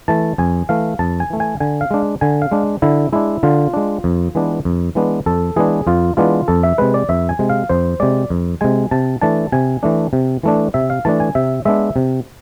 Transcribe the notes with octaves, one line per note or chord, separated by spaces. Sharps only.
E3 A3 A5
F2 G#5
E3 A3 F5
F2 A5
G#5
E3 A3
G#5
D3 G#5
F5
G#3 D4
D3 G#5
F5
G#3 D4
D3 E4
G#3 D4 E4
D3 F4
G#3 D4
F2
E3 G#3 B3 D4
F2
E3 G#3 B3 D4
F2 A4
E3 G#3 B3 D4 G#4
F2 F4
E3 G#3 B3 D4 F4
F2 A4
E5
C3 G#3 B4
D5
F2 E5
G#5
C3 G#3
F5
F2 C5
C3 G#3 D5
F2
C3 G#3 G#5
C3 A5
E3 A3 D4 A5
C3 G#5
E3 A3 D4
C3
E3 A3 D4
C3 E5
F5
E3 A3 D4 A5
G#5
C3 E5
G#3 B3 D4 E5
C3